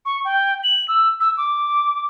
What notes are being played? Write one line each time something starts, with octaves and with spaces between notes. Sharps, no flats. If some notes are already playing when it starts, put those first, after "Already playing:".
C#6
G5
F#7
E6
E6
D6